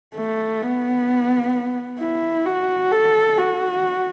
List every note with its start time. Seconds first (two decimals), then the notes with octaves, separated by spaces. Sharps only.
0.15 A3
0.62 B3
2.00 E4
2.46 F#4
2.92 A4
3.38 F#4